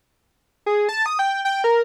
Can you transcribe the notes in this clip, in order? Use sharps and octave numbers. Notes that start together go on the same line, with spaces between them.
G#4
A5
D#6
G5
G5
A#4